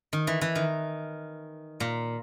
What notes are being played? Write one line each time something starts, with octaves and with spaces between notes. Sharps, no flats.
D#3
E3
E3
D#3
A#2